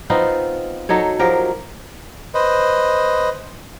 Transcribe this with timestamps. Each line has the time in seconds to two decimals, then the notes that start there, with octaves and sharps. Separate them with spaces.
0.10 B3 C4 D#4 F4
0.89 F#3 D#4 A4 C#5
1.19 F3 F#3 G4 A#4
2.34 B4 C5 D#5